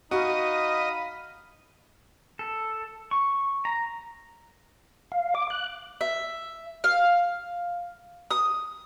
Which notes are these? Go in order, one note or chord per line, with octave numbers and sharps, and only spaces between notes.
D#4 F#4 D#5 F5 B5
A4
C#6
A#5
F5
D6
F#6
E5
F5
D#6